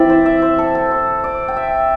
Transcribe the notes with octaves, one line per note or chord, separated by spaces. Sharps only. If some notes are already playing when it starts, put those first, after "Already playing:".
Already playing: E3 C4 E4 D5 E5
C5
E5
C5
A4
A4
C5
D5
G5
E5